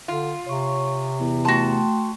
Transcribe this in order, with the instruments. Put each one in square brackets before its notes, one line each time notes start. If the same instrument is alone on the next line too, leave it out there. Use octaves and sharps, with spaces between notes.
[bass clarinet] D3 [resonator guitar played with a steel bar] F4
[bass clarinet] C3 [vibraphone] C#5 C#6
[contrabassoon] E2
[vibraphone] A3 G5 C6 [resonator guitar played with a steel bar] F#4 A5